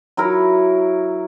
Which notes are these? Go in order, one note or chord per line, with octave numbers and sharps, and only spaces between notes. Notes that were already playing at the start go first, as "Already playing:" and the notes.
F#3 E4 A#4